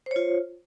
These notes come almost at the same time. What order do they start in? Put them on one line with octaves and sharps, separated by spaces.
C5 C#5 F4